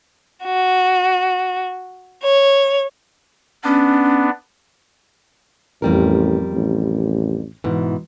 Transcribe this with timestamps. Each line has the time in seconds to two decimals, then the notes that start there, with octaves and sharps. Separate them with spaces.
0.45 F#4
2.25 C#5
3.64 B3 C#4 D4
5.82 A1 F2 G3 A#4
6.53 A1
7.64 G#2 B2 E3